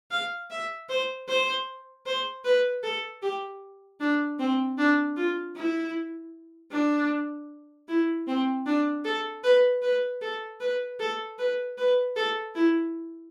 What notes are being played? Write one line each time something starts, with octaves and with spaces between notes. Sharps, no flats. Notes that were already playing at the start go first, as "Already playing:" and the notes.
F5
E5
C5
C5
C5
B4
A4
G4
D4
C4
D4
F4
E4
D4
E4
C4
D4
A4
B4
B4
A4
B4
A4
B4
B4
A4
E4